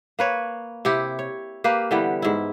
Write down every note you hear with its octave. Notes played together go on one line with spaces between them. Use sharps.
A#3 B4 C#5
C3 E4 G4
C#5
A#3 G4 B4 F5
D3 E3 G3 B3
G#2 E4